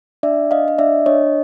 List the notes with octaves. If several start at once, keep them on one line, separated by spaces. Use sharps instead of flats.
D4 D5 E5
D4 D#5 F5
D#5
D4 D5 E5
D4 C#5 D#5